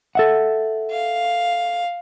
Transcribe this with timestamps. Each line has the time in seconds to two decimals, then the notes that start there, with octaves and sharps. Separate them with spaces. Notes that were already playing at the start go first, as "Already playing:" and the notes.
0.15 A4 E5 F#5
0.91 F5